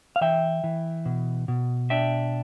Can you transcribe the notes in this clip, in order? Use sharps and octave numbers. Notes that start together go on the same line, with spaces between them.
F5
E3 E5 G5
E3
B2
B2
D4 E5 G5